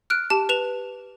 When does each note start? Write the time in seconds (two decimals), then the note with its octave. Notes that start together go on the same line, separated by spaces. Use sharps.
0.10 F6 F#6 D7
0.30 G4 A5 E7
0.49 B4 E7 F7